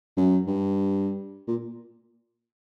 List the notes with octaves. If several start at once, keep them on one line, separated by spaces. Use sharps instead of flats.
F#2
G2
A#2